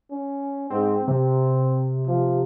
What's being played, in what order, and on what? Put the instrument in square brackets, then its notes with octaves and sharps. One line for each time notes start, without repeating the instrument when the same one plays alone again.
[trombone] C#4
[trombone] G#2 [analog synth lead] C4
[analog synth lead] C3 [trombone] C4
[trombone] F3